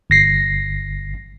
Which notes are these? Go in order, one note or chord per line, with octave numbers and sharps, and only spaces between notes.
G1 A#6 C7